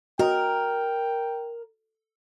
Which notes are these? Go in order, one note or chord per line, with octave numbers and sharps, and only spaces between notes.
F#4 A#4 D#5 G5